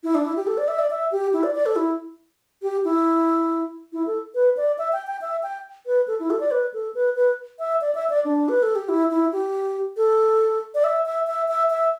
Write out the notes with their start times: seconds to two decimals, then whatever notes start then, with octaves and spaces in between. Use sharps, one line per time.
0.04 E4
0.15 D4
0.25 E4
0.36 G4
0.47 A4
0.58 D5
0.68 E5
0.79 D5
0.90 E5
1.12 G4
1.33 E4
1.43 D5
1.55 D5
1.66 A4
1.76 E4
2.62 G4
2.85 E4
3.93 E4
4.07 A4
4.35 B4
4.57 D5
4.78 E5
4.93 G5
5.07 G5
5.21 E5
5.43 G5
5.86 B4
6.08 A4
6.20 E4
6.30 A4
6.40 D5
6.51 B4
6.74 A4
6.95 B4
7.16 B4
7.59 E5
7.81 D5
7.95 E5
8.10 D5
8.25 D4
8.49 B4
8.63 A4
8.75 G4
8.89 E4
9.11 E4
9.33 G4
9.97 A4
10.75 D5
10.84 E5
11.06 E5
11.27 E5
11.48 E5
11.70 E5